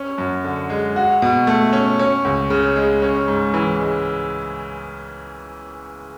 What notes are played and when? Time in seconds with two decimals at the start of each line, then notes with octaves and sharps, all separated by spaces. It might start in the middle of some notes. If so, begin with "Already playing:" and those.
Already playing: C#4
0.18 F#2
0.44 D3
0.70 G#3
0.96 F#4
1.22 B2
1.47 A3
1.73 C#4
1.99 C#4
2.25 C#2
2.50 C#3
2.76 G#3
3.02 C#4
3.28 G#2
3.54 E3
3.80 G#3